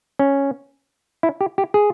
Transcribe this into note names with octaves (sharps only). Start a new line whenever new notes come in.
C#4
E4
G4
G4
G#4